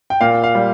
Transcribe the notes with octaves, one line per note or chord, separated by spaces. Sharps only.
G5
A#2 F5
F5
G3